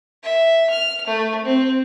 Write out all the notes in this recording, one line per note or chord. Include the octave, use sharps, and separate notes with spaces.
E5
F6
A3
C4